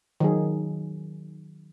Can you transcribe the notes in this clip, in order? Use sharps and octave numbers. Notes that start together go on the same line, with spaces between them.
D#3 F#3 G#4